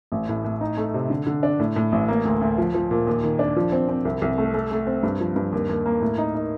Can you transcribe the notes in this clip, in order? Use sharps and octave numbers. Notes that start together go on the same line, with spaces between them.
A1
A2
A2
D#4
A3
C3
D3
D3
D4
A2
A2
A1
A#3
D2
D2
F3
F3
A#2
D#2
D#3
D4
F3
C4
C4
C2
C2
A3
A3
A3
C4
G2
F3
G2
D#2
D#2
A#3
A2
D#4
D#4